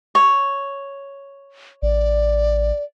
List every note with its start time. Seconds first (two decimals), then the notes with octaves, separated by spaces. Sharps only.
0.15 C#5
1.82 A1 D5